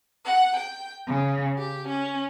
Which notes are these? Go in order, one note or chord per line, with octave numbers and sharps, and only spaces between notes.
F#5
G5
C#3
G4
C#4